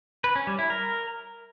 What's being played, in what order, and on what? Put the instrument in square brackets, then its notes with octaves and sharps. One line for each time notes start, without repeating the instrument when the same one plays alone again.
[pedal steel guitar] B4
C#4
G3
E4
A#4